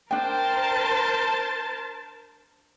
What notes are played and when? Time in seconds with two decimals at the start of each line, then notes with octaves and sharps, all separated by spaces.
0.11 D4 A#4 C5 G5 A5